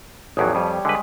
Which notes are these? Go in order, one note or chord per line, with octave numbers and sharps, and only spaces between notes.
A1 E2 F3 F#3 G4 G#4
F2 G3 C#5
D3 G#3 B4